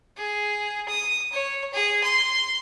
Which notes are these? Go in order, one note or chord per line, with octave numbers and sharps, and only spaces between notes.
G#4
D#6
C#5
G#4
C6